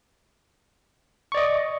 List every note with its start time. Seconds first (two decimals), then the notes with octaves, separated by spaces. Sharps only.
1.32 C#6
1.35 D5
1.37 D#5